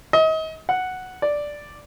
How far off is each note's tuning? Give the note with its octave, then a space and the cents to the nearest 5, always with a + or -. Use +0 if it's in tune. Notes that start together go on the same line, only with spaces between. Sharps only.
D#5 +35
F#5 +0
D5 +0